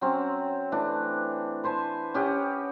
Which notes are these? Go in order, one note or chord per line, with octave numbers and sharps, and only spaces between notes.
F#3 C4 C#4
E3 A3 D4
B4 C5 G#5 A5
C#4 G4 D#5 F#5